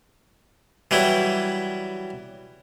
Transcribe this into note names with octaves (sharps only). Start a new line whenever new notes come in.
E3 F#3 G3 E4